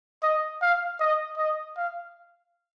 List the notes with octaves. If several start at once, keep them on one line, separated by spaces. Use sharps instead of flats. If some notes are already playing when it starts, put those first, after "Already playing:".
D#5
F5
D#5
D#5
F5